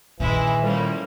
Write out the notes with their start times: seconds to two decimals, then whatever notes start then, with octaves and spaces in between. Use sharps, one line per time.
0.20 A#2 D#3 E3 G#3 E4
0.63 A2 F3 G3 A#3 C#4